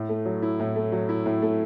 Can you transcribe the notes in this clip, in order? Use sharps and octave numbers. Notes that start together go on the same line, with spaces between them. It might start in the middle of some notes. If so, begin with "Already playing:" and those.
Already playing: A2
A3
F#3
E4
A2
A3
F#3
E4
A2
A3